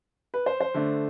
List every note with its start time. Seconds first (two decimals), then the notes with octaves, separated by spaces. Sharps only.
0.34 B4
0.46 C5
0.60 C5
0.74 D3 A3 D4